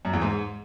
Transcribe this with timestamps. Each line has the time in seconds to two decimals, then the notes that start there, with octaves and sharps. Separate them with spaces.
0.05 F#2
0.13 E2
0.22 G#2